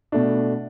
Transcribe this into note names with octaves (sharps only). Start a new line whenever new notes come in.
B2 A3 D4